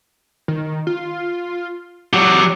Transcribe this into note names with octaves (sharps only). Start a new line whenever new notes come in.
D#3
F4
F#3 G4 F#5